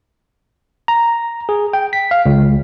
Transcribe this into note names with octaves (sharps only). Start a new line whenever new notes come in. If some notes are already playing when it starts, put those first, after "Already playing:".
A#5
G#4
G5
B6
F5
C#2